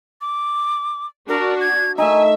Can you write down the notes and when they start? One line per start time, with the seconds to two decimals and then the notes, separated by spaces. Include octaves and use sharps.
0.21 D6
1.29 D4 F#4 A#4
1.61 G#6
1.98 A3 D#4 E5 G#5